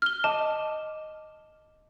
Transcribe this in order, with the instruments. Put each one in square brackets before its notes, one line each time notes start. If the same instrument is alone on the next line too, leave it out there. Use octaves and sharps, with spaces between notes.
[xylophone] F6 G7
[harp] D#5 D6 [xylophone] A5